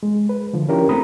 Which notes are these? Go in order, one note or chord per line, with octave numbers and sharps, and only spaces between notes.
G#3
B4
D3 F3
C#4 D4 E4 F4 G4 A#4
A3 C4 A#5 B5 D#6